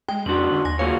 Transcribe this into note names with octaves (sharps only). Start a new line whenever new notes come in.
G#3 G5
F2 G#2 C#3 D4 F#4 C6 F#7
D3
D#2 G#5 A#6
C#3 A#3 F4 F#4 G#4 C#5 F5